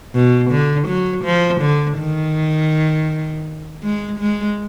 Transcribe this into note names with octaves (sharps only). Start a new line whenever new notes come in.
B2
D3
F#3
F3
D3
D#3
G#3
G#3